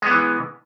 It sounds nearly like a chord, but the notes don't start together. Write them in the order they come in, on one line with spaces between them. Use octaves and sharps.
G#3 B3 E3